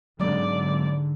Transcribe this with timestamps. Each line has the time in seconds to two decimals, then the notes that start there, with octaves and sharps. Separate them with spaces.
0.20 G#2 D3 F#3 G#3 A#3 D5